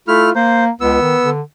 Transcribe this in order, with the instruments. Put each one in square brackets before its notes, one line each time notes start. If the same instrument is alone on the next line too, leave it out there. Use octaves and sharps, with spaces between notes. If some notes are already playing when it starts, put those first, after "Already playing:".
[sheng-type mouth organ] A3 E4 F6 [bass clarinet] F4
[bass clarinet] A#3 [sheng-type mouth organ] C5
[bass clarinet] C#2 [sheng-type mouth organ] B3 E6
[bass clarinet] D#3
D3